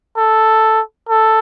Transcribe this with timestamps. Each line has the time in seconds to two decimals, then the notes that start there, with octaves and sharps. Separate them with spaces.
0.17 A4
1.09 A4